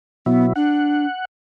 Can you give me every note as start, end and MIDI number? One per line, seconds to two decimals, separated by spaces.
0.26 0.53 47
0.26 0.53 54
0.26 0.46 59
0.26 0.53 64
0.56 1.06 62
0.56 1.25 78